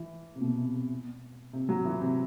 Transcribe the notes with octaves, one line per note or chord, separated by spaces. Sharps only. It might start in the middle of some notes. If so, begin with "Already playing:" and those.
Already playing: E3
C3
B2
C3
C3
C3
F#3
E3
C3